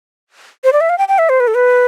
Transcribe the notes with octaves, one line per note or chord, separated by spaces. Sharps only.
C5
D5
E5
F5
G5
G5
E5
C5
B4
A4
B4